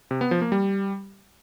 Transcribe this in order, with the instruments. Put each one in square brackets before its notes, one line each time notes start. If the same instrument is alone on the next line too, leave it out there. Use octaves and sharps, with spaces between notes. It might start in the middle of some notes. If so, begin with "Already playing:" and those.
[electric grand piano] C3
B3
F3
A#3
G3